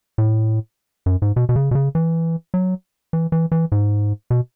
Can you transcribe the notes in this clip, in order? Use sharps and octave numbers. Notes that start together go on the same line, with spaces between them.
A2
F#2
G#2
B2
B2
C#3
B2
C#3
E3
F#3
E3
E3
E3
G#2
B2